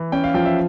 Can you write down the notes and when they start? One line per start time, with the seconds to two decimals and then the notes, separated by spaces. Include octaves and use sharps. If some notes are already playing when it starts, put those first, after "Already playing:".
Already playing: E3
0.12 C#4 G5
0.24 F5
0.34 F3 G5
0.45 E5